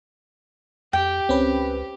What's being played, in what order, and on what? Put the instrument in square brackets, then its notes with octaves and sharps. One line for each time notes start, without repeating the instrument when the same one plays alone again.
[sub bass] F2 [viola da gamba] G4 [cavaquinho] G5
[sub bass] C#2 [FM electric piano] C4 C#4 B4